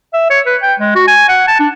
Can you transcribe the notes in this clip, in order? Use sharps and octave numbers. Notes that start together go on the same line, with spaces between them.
E5
C#5
B4
G5
G#3
F#4
G#5
F#5
A5
D4